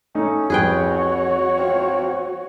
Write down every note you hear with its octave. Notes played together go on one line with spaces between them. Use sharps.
A3 C#4 D#4
C2 F2 F#4 G#4 B4 C#5 G5
F3 C4